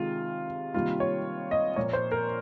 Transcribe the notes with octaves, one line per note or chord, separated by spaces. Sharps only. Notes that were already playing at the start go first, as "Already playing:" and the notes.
Already playing: C3 D#3 G#3 F4
C3 D#3 G3 A#3 F4
C#5
D#5
A#2 F3 A#3 C#5
C5
A#4